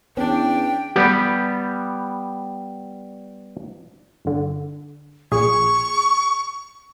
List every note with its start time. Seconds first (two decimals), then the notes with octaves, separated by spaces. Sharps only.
0.17 E2 B3 C#4 D4 G5
0.96 G3 B3 G4
4.25 G1 D3
5.32 A#1 A#2 G#4 C#6